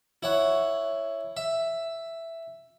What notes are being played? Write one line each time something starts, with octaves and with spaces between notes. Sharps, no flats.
E4 C#5 F#5
E5